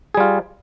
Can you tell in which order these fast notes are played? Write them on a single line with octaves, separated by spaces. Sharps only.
G#4 G3 F4